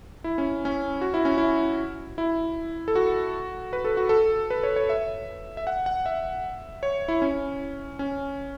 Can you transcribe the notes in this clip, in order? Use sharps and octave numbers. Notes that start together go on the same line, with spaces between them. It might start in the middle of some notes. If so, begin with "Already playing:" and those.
E4
C#4
C#4
F#4
E4
C#4
E4
E4
A4
F#4
B4
A4
F#4
A4
B4
C#5
C#5
E5
E5
F#5
F#5
E5
C#5
E4
C#4
C#4